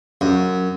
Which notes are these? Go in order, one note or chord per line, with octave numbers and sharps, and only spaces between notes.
F#2